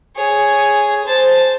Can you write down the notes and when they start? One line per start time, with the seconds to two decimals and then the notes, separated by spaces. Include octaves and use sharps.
0.16 G#4 C#5
1.05 C5 A5